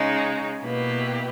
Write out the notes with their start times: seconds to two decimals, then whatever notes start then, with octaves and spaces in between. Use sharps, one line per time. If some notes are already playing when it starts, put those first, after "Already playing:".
Already playing: C#3 G#3 D#4
0.64 B2 A#3 E4 G4 B4